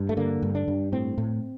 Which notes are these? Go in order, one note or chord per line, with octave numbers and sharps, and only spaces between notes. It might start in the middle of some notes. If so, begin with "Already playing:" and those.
Already playing: G2
A3
D3 A#3
G2
D4
G2
A2 C4
A2